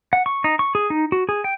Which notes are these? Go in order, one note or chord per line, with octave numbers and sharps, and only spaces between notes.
F#5
C#6
D#4
C#6
G#4
D#4
F#4
G#4
G5